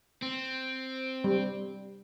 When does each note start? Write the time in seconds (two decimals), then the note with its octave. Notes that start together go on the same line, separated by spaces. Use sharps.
0.22 C4
1.24 G3